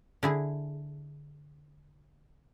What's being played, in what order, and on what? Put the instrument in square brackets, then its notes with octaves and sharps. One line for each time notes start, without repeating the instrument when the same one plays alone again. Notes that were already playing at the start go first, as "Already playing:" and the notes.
[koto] D3 E4 G#4